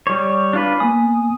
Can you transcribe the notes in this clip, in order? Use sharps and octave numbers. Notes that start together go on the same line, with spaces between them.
G3 C#5
D4 F4 B4
A#3 B3 G#5 D#6